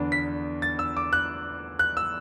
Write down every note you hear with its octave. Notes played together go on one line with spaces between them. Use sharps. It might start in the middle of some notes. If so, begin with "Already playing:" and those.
Already playing: E2 D3 B3 D4
B6
A6
E6
D6
F#6
F#6
E6